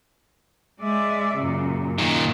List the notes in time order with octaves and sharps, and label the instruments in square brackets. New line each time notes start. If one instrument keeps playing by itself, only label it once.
[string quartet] G#3 D5 E5
F#2 A#2 C#3
[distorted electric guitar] A#2 D#3